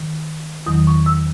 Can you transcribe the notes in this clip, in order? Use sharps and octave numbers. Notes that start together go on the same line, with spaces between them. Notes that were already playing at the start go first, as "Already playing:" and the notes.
Already playing: D#3
E2 D#3 F#3 D#6
C#6
E6